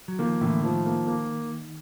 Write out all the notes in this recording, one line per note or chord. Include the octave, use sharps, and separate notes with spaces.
F#3
D#3 F3 A#3
A2 D3 E3
D#3 F3
A#3
A#3